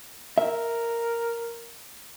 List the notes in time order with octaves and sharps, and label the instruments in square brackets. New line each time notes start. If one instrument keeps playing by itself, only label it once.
[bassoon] A#4 [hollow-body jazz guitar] E5